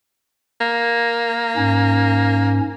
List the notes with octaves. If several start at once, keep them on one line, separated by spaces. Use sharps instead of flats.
A#3
G#2 C#4